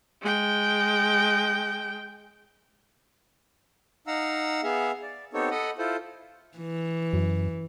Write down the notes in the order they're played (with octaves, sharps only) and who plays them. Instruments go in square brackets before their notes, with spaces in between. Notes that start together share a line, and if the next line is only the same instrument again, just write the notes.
[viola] G#3 G5
[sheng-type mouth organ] D#4 F5 F#5 A#5 E6
B3 G#4 E5 F5
D5
B3 C4 D#4 G4 A4 C#5
A4 D#5 F#5 B5
E4 F4 A4 C5
[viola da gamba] E3
[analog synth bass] F#2